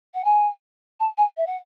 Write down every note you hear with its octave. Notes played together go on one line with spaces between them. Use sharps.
F#5
G#5
A5
G#5
E5
F#5